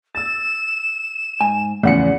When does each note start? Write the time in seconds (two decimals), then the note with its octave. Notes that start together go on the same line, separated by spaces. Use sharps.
0.15 E6 A6 E7
1.41 G#2 G#5
1.83 E2 A2 C#3 F3 F#5 C#7